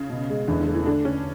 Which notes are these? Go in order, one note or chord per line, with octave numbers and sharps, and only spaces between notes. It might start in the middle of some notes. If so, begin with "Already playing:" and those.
Already playing: C#3
B2
G#3
E2 D3
D3
A3
E3
D3 D4
D3 C#4